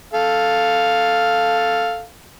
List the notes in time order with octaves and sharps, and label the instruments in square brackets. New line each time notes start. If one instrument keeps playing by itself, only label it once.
[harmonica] A4 F5